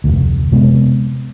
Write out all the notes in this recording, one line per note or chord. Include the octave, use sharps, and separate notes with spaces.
F1 D2
C3 G#3 B3